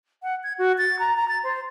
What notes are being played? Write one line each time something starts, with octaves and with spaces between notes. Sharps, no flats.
F#5
G#6
F#4
A6
A#5
A#5
A6
C5